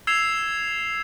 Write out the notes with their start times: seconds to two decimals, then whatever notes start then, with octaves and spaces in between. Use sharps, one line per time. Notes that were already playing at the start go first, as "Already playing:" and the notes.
0.07 E6 G#6 C7 E7 F7